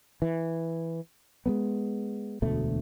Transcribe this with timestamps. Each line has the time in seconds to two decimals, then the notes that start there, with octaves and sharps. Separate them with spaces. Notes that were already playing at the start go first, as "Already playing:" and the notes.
0.22 E3
1.46 G#3 A3 B3
2.42 E1 D2 B2 A3